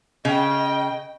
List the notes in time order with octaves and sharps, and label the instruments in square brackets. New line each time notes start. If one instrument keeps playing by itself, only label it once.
[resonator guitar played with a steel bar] C#3 [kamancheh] D#5 G5